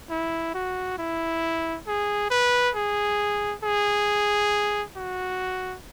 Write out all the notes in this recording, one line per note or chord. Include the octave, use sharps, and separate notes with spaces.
E4
F#4
E4
G#4
B4
G#4
G#4
F#4